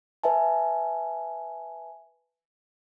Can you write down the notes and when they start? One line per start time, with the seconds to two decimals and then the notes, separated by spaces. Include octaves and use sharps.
0.24 B4 E5 G#5 A5